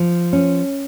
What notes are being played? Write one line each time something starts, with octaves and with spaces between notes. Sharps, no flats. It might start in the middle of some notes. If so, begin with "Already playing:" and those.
Already playing: F3
C#4